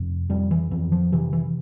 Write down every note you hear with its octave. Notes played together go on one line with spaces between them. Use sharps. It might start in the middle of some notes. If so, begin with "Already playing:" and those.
Already playing: F2 C3
F2 G3
E3
F2 E3
F3
C3 E3
E3